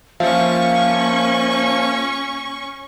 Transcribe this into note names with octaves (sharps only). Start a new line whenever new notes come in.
F3 A#3 C#4 E5 F5 C#6